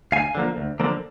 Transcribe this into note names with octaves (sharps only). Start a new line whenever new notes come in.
D2 F5 G#5
D3 F3 A#3
D2
D3 F3 A#3